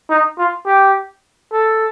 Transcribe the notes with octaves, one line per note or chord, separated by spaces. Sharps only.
D#4
F4
G4
A4